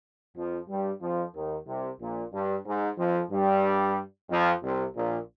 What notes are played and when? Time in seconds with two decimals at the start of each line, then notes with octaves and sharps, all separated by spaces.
0.36 F2 F3
0.69 G2 G3
1.01 F2 F3
1.34 D#2 D#3
1.67 C2 C3
2.01 A#1 A#2
2.33 G2
2.66 G#2
2.98 F2 F3
3.31 G2 G3
4.30 F2 F3
4.63 C2 C3
4.95 A#1 A#2